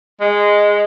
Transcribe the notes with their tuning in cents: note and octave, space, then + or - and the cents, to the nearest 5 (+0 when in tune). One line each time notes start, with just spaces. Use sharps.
G#3 -10